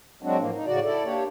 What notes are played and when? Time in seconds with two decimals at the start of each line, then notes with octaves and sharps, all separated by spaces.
0.23 F#3 G#3 C4 D4 F#4
0.38 A2 F3 A#3
0.53 D#4
0.66 A2 C#3 F#4 D5
0.83 E4 A4 D5
1.04 A#3 D4 G4 C#5